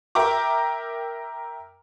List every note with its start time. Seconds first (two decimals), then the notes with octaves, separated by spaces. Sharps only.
0.15 A#4 E5 G5 A#5 D6